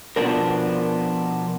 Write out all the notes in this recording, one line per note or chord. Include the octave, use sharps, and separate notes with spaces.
B2 F3 G#3 B3 D4 A#4